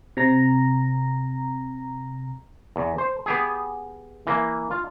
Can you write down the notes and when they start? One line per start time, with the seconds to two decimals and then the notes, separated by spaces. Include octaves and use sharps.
0.17 C3 A#5
2.76 E2
2.98 C5
3.26 B3 G4 G#4
4.27 E3 A#3
4.71 F4